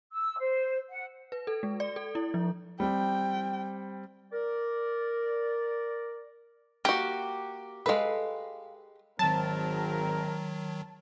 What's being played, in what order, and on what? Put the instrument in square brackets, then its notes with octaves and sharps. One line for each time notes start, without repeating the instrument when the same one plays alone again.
[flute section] E6
C5
F#5
[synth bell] B4
A4
G#3
D5
A4
E4
F3
[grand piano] G3 C4 [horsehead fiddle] G5
[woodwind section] A#4 D5
[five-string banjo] A#3 F#4 [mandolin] G4
[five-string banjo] G#3 B4 [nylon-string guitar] A4 F5
[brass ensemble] G#1 C4 A#4 [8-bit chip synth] D#3 F#3 [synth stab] A5